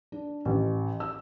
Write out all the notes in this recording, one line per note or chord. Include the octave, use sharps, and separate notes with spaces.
D4
A1
E6